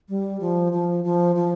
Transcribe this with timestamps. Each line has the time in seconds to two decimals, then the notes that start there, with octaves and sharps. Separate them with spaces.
0.09 G3
0.40 F3
0.73 F3
1.05 F3
1.36 F3